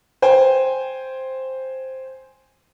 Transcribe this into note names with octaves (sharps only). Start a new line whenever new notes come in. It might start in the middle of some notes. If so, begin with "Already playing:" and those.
C5 G5 G#5